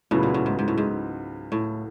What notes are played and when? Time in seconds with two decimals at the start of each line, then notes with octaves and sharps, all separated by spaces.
0.11 C#2 A2 C#3 F#3 B3
0.23 A#2
0.34 A2
0.46 G#2
0.59 G#2
0.68 A2
0.78 G#2
1.52 A2